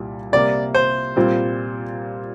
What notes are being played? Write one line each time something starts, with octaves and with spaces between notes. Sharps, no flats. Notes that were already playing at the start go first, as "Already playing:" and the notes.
Already playing: C2 A#2 G3
C3 G3 A#3 D5
C5
A#2 G3 C4 F4